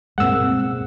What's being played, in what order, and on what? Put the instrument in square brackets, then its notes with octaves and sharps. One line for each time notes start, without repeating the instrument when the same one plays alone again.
[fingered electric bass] C#2 G2 B2 [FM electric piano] G#3 A#3 C4 [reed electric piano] F#5 E6